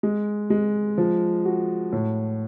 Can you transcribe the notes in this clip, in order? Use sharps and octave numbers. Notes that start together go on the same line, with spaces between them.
G#3
G#3
F3
F#4
A2